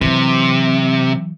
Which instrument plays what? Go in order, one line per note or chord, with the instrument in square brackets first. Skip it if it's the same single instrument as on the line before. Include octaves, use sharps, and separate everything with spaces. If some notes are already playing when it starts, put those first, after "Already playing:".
[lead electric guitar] C3 [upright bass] E3 F#3